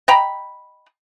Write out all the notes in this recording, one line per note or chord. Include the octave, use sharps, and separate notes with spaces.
D#5 G5 A#5 B5